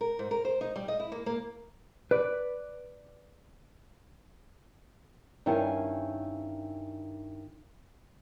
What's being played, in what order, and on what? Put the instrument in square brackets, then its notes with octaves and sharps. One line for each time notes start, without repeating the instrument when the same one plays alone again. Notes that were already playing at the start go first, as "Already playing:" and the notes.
[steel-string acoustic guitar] A#4
G#2
A#4
C5
D#4
G3
D#5
E4
A#3
A#3
[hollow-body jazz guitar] B4 D5
[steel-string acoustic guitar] G2 D#3 C#4 E4 F5 G#5